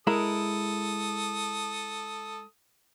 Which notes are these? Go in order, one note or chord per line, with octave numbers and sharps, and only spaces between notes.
G#3 E4 A4 A#4 D#6